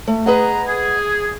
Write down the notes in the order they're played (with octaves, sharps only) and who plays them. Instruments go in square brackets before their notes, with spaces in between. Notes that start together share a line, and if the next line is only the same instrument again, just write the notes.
[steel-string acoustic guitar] A3
[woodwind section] G#4 A#5 [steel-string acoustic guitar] B4 D#5 F#5
[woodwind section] G#4